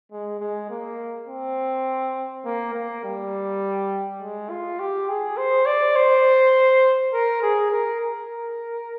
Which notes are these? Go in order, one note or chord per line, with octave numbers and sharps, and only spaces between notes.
G#3
G#3
A#3
C4
A#3
A#3
G3
G#3
F4
G4
G#4
C5
D5
C5
A#4
G#4
A#4
A#4